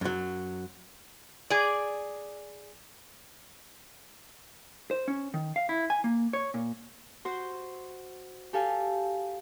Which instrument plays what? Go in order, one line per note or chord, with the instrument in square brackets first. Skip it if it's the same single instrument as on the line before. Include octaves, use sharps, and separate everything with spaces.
[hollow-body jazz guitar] F#2 F#3
[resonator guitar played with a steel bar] G#4 D5
[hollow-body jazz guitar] C5
C#4
D#3
F5
E4
G#5
A#3
C#5
A#2
[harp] F#4 C5 G6
G4 A4 F5 G#5